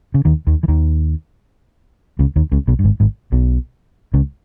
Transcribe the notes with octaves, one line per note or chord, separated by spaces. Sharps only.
C#3
D#2 D#3
D#2 D#3
E3
D#2 D#3
C#2 C#3
D#2 D#3
C#2 C#3
B1 B2
G2
G#1 G#2
G#1 G#2
B1 B2
C#2 C#3